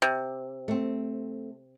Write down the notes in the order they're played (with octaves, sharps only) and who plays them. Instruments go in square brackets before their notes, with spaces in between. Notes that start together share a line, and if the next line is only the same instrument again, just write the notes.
[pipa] C3
[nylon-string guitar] A3 C4